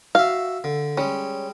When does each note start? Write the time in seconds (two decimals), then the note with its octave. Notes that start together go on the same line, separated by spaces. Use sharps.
0.15 F#4 E5 F5
0.64 D3
0.97 G3 G#3 C#4